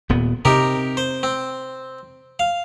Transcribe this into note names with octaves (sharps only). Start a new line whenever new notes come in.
D#1 A#2 B3
C3 D#4 G4 A#4
C5
C4
F5